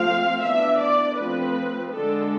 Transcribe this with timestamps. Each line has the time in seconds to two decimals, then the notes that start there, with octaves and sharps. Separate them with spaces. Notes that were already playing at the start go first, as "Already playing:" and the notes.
Already playing: F3 A3 C4 F5
0.43 E3 B3 D4 E5
0.80 D5
1.17 F3 A3 C4 B4
1.92 D3 G#3 D4 A4